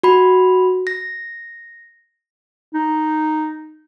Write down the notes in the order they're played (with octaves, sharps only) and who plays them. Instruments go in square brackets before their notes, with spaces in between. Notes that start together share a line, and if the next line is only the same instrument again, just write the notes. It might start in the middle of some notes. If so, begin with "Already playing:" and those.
[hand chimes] F#4 B5
A#6
[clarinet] D#4